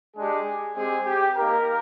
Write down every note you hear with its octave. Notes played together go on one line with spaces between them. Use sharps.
G#3 D4 G4 G#4
G#3 C4 G4 G#4
G4
A#3 D#4 G4 A#4